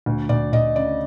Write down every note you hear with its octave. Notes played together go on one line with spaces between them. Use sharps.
D2
D2 D5
D2 D#5
C#3 D5